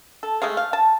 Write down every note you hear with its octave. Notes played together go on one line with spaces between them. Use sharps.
A4
G#3 A3 G#4 F5
F5
A5